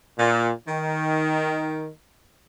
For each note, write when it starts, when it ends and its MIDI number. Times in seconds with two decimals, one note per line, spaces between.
0.18 0.51 46
0.68 1.88 51